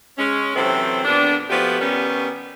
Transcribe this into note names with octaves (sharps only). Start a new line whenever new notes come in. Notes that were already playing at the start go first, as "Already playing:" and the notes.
G#3 C#4
C3 E3 F#3 C4 A4
F2 A#2 B3 D4
F3 A3 B3 F#4 G4
D#3 G3 B3 C#4